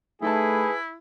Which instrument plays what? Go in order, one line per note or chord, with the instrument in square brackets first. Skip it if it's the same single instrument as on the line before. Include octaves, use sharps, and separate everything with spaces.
[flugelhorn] A3 [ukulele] D#4 A4 A5 [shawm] E4 [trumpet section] G#4 B4